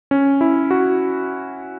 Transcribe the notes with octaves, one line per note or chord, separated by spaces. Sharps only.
C#4
E4
F#4